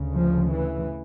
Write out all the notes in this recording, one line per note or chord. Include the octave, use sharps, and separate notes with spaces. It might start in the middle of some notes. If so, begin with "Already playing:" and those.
Already playing: D2 C#3
F3
E3